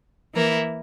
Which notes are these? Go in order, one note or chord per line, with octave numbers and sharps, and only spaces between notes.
E3 A#3 E4 A#4